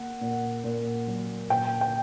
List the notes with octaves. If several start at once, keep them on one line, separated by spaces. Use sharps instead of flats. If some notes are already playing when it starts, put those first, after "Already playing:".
Already playing: A#3 F#5
A#2
A#2
F#3
A#2 G5
G5